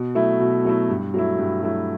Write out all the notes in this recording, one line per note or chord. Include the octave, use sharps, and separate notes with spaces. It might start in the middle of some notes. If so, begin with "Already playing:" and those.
Already playing: B2
F#3 A3 E4
B2
F#3 A3 E4
G2
F#3 A3 E4
G2
F#3 A3 E4